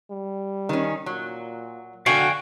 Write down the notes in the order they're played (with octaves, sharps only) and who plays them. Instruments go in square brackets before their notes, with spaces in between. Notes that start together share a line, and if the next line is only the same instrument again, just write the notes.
[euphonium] G3
[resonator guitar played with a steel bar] D#3 C#4
[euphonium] A#2 [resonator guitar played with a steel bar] F#3
[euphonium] D3 [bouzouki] F#4 [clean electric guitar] F5 G5 G#5